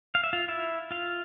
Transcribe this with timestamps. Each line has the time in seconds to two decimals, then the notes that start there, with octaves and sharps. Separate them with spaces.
0.15 F5
0.24 E5
0.33 F4 F5
0.48 E4 E5
0.91 F4 F5